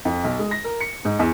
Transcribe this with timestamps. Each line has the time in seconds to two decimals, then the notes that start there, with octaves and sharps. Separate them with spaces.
0.05 F2
0.24 B1
0.39 G#3
0.51 A#6
0.64 A#4
0.81 C#7
1.05 G#2
1.19 E2